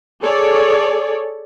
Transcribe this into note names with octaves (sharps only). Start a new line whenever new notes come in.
G#4 A4 C#5 D5